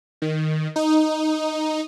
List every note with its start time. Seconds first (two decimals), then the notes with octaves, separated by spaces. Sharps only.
0.22 D#3
0.76 D#4